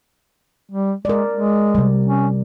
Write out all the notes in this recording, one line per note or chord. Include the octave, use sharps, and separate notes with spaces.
G3
G#3 A#4 D5
G#3
C3 G3
C#4